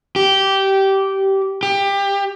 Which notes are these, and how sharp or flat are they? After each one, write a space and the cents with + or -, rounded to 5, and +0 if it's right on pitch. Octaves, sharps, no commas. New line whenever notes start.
G4 -15
G4 +20